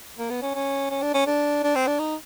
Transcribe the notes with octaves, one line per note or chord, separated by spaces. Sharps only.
A#3
B3
C#4
C#4
C#4
D4
C#4
D4
D4
C4
D4
D#4